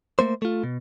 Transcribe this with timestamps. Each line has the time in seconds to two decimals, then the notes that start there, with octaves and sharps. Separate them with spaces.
0.19 A3 A#3 C5
0.42 A3 F4
0.63 B2